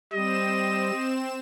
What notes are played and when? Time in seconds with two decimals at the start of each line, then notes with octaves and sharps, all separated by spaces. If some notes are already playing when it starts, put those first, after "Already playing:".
0.13 G3 C4 D#5 E7